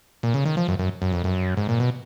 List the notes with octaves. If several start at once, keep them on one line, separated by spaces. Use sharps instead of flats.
A#2
C#3
D#3
F3
F#2
F#2
F#2
F2
F#2
G#2
A#2
B2